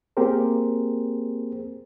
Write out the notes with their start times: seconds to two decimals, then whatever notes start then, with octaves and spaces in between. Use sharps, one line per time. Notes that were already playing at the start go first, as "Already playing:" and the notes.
0.17 A#3 C4 G4 G#4 A#4 C5